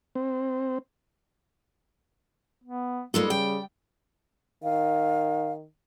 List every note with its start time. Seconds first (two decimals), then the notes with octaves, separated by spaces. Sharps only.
0.15 C4
2.64 B3
3.14 A#2 G3 G#3 D#4 A4
3.30 C#3 G5
4.63 D#3 F5